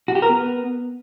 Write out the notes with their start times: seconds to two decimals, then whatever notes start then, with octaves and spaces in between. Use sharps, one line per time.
0.08 F#4
0.15 G4
0.22 A#4
0.29 B3